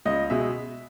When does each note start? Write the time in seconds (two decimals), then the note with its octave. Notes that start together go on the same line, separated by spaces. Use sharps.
0.05 C#2 D#5
0.30 B2 G#3 E5